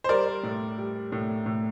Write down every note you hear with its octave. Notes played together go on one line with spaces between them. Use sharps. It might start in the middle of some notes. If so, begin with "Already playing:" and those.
C5
G3 A#4 D5
A2
G3
A2
A2